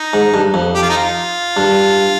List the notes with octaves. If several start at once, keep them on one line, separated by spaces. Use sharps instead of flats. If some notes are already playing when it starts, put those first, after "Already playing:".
Already playing: D#4
G#2
G2
F2
G4
F4
D#4
F4
G2